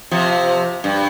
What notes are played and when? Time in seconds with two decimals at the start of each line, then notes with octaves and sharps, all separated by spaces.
0.11 C3 F3
0.84 G2